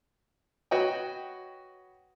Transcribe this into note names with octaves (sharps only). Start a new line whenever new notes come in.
F#4 B4 C#5 D#5 F#5 G5